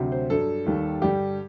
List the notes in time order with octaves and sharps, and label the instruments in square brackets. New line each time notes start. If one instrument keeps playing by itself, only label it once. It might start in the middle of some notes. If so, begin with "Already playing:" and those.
Already playing: [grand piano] D2 C3 F#3
C5
G2 F#3 A4
D#2 D#3 G3
G2 D3 G3 G4